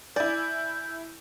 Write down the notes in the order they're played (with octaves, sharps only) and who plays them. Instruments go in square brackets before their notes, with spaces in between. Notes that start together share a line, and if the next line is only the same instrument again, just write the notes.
[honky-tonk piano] E4 G#5 [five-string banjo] D5 [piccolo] G6